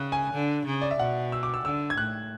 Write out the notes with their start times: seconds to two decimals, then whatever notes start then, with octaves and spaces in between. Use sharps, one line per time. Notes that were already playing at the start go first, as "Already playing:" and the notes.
Already playing: C#3 F#6
0.12 G#5
0.33 D3
0.66 C#3
0.82 D5
0.91 E5
0.99 B2 F#5
1.32 E6
1.43 D6
1.54 E6
1.64 D3 E6
1.90 G#6
1.98 A2 F#6